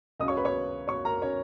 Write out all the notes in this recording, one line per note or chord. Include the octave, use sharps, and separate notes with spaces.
C#2 C#3 F#3 D#5 D#6
C#5 C#6
B4 B5
C#5 C#6
C#5 C#6
A#4 A#5
C#4 C#5